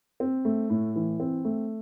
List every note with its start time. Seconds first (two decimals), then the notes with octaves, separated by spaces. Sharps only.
0.20 C4
0.45 A3
0.70 A2
0.96 E3
1.20 C4
1.45 A3